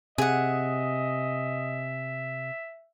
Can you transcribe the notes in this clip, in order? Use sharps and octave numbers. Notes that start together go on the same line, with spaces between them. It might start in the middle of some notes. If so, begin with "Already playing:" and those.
C3 G#4 D#5 E5 F#5